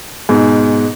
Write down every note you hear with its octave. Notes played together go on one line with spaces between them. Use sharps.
G#2 B2